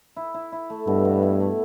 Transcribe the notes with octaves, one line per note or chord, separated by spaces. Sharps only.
E4
E4
E4
A3
G2 B2
B2
E4
A3